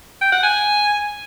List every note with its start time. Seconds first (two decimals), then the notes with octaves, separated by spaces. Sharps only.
0.22 G5
0.32 F#5
0.43 G#5